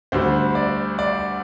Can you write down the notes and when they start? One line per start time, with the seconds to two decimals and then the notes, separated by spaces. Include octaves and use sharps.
0.12 D2 D3 G3 C5
0.55 D5
0.99 D5